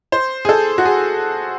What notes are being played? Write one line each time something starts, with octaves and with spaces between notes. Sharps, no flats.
C5
G#4
A4
F#4
G#4